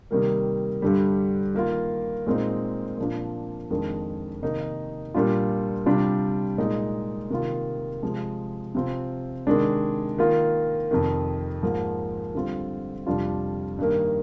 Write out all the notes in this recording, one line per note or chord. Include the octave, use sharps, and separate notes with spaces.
C3 D#3 G3 A#3
G2 D3 G3
D#3 A#3 F4
A#2 G#3 C4 D#4
A#2 F3 A#3 D4 F4
F2 D#3 G#3 D4
C3 D#3 A#3 D#4
A#2 G3 D4 F4
C3 G3 D4 F4
A#2 G#3 D#4
C3 D#3 A#3 F4
C3 F3 G#3
C3 F3 C4 F4
C3 D#3 G#3 D4
D#3 A#3 F4
F2 C3 D#3
G#2 F3 A#3
D3 G3 C4 F4
F2 C3 G3 D4 F4
G2 D#3 A#3